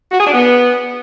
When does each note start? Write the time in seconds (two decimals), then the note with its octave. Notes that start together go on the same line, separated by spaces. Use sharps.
0.12 F#4
0.19 G#4
0.26 D4
0.34 B3